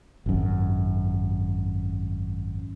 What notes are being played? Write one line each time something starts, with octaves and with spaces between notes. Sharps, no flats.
G#1 F#2